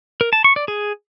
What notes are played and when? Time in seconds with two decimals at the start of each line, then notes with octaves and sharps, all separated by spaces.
0.21 A#4
0.33 A5
0.44 C#6
0.56 D5
0.68 G#4